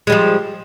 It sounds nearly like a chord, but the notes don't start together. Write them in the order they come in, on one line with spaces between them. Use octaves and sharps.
G#3 G3 F3